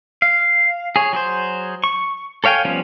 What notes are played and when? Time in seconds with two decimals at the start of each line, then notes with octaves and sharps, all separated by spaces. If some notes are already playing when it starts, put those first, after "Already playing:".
0.22 F5
0.96 G#4 C#5
1.13 F#3 G#4 C5
1.84 C#6
2.44 A4 C#5 F5 G5 G#5
2.65 F3 G3 B3 C#4